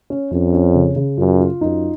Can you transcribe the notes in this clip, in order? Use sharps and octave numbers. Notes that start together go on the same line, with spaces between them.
C#4
F2 C#4
C#4
C#3
C#3
F#2 F4
F4
F#2 D#4